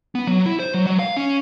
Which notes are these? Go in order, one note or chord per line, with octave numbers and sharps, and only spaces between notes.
B3
F#3
E4
C5
F#3
F#3
F5
C#4